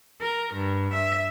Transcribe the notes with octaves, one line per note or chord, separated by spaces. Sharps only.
A#4
G2
E5